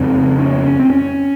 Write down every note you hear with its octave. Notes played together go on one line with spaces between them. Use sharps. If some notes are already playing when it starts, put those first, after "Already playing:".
Already playing: F2 C#3 C4
C#4
C#4
C4
C#4